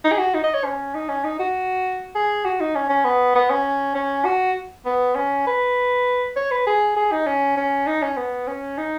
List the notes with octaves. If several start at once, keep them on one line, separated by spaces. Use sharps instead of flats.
D#4
G#4
F#4
D#4
D#5
C#5
C#4
D#4
C#4
D#4
F#4
G#4
F#4
D#4
C#4
C#4
B3
B3
C#4
C#4
F#4
B3
C#4
B4
C#5
B4
G#4
G#4
D#4
C#4
C#4
D#4
C#4
B3
C#4
D#4